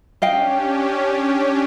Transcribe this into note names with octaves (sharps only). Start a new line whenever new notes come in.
C#4 D4 G4 D#5 F5 G5